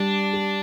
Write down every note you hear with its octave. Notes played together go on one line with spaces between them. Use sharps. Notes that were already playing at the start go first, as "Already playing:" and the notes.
Already playing: G3 D4
G4